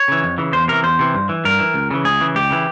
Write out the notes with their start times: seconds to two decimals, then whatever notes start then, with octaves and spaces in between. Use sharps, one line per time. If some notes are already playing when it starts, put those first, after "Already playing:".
Already playing: C#5
0.08 C#3 E3
0.23 F2
0.38 C#3 E3
0.53 E2 C5
0.68 C3 E3 A#4
0.83 E2 C5
0.99 C3 E3
1.15 G2
1.29 E3
1.45 G2 A#4
1.59 E3
1.74 C#2
1.91 C#3 E3
2.05 C#2 G#4
2.21 C#3 E3
2.35 C#2 G4
2.50 C#3 E3